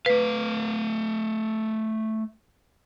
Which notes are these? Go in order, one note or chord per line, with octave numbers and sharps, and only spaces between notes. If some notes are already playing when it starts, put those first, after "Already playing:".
A3 B4 F5